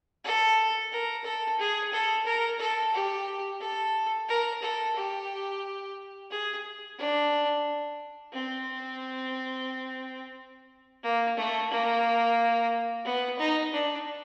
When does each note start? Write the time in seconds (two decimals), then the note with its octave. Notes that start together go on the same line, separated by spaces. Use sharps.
0.24 A4
0.92 A#4
1.24 A4
1.59 G#4
1.93 A4
2.26 A#4
2.59 A4
2.94 G4
3.61 A4
4.29 A#4
4.62 A4
4.96 G4
6.31 G#4
6.99 D4
8.33 C4
11.03 A#3
11.37 A3
11.71 A#3
13.05 B3
13.39 D#4
13.73 D4